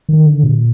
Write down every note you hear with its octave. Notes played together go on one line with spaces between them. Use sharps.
D#3
D3
A#2